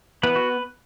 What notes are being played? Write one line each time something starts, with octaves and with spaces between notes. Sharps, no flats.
E3 B3 B4
F#4